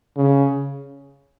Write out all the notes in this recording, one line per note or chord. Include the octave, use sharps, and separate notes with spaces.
C#3